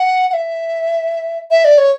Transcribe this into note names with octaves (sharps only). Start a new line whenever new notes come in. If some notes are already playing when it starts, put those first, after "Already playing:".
Already playing: F#5
F#5
E5
E5
D5
C#5